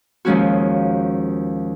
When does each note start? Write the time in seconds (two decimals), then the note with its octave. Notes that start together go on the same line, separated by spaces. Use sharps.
0.25 D#2 F3 G#3 C#4 F#4